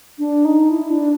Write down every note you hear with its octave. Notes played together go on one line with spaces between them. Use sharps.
D4
D#4
E4
D4